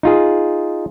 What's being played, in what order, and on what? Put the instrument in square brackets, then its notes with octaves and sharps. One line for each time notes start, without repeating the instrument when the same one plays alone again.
[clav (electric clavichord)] D#4 F4 G#4